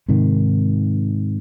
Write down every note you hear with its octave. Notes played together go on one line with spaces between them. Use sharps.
G#2 C3 D#3